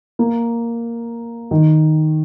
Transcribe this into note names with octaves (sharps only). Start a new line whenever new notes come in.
A#3
D#3